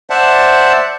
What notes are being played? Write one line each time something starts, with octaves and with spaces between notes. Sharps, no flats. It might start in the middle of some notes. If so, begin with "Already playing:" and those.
C5 D5 E5 F#5 A5